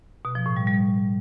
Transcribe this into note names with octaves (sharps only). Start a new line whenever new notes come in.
B2
F3
A2
G3
G3